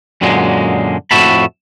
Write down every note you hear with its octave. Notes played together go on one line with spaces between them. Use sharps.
F#2 A#2 D3 F#3 G#3
F2 A2 F#4 E5 A5 B5